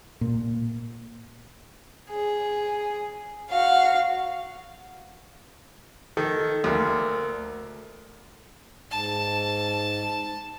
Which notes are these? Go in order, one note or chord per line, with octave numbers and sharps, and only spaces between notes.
A#2
G#4
F#4 F5
D#3 A4
D2 A#3
G#2 A5